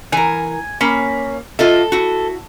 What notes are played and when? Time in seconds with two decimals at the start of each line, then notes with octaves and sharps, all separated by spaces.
0.12 E3 A#4 G#5
0.81 A#3 C#4 B5
1.59 F4 A4 D#5 E5
1.92 E4 F#4